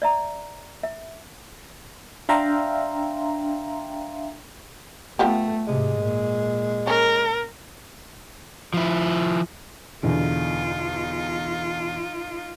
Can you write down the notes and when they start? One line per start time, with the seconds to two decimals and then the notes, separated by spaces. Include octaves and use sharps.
0.02 D5 E5 A#5
0.83 E5
2.29 D4 E5 F5 G5 A#5 C6
5.19 F3 A3 B3 G4
5.68 G#2 C3 G#3
6.01 A#2
6.87 C#4 A#4
8.74 F3 E4
10.03 E2 B2 D3 D#4 F4